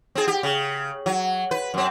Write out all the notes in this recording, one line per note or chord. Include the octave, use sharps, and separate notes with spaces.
C4 G#4
G4
C#3
F#3
B4
F#2 C4